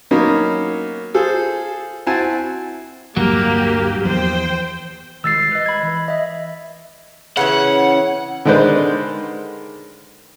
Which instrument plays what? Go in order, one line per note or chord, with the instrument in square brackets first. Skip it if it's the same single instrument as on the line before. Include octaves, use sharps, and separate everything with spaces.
[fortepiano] F#3 A#3 B3 C#4 D#4
F4 G#4 A4 C5
C4 E4 F#4 G#5 A5
[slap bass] D1 G2 [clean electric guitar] F#3 [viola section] A#3 G4
[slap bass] E2 F3 [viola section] C5 G5
[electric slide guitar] D#3 G3 G#3 [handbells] E6 A6 C7
[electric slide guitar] B4 D#5
[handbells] B5 G#6
[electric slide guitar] E3
[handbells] D#5 E5
[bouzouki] C#3 E3 C#4 [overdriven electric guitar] F#5
[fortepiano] D3 D#3 G#3 B4 C5 D5